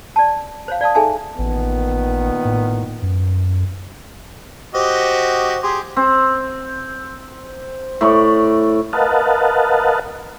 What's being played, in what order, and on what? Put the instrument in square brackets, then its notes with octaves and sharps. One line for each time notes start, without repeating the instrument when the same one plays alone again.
[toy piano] D5 A5
C5 C#5 F5
D5 F5 A5 D#6
D#4 G#4 A4 E5 G#5 A5
[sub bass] A1 [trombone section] A#2 D#3 B3
[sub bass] A2
F#2
[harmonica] F#4 G4 D#5 [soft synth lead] C5
[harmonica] G4 G#4 [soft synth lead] C6
[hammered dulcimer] C4
A2 D5 C#6
[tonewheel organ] A#4 B4 D#5 F5 F#5 A5